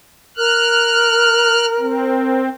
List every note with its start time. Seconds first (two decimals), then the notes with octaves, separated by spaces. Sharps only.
0.37 A#4 F6 F#6
1.80 C4